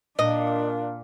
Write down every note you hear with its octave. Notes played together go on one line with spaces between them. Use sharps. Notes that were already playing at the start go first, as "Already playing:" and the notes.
A#2 D4 D#5